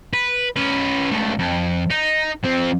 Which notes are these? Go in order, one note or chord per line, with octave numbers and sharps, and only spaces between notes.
B4
C#4 B4
C#2 A3
F2
D#4
F3 C4